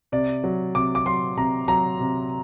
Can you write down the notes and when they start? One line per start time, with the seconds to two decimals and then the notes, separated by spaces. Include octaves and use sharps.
0.12 C3 D5
0.44 F#3
0.75 C3 D6
0.95 D6
1.06 F#3 C6
1.37 C3 A#5
1.68 F#3 A#5
2.00 C3